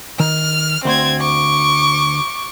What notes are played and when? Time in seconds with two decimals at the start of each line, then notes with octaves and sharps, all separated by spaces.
0.20 D#3 F6
0.85 D2 C4 C6 G#6
1.21 C#6 D6